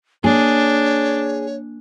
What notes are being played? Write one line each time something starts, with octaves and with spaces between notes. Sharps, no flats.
A#3 D4 G#4 C#5